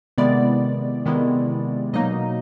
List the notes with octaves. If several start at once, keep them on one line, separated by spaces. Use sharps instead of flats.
C3 D#3 G#3 B3 E4 D5
C3 D#3 G#3 B3 E4
B2 F#3 A#3 D#4 D#5